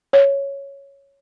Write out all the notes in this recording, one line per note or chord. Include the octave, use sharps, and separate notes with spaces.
C#5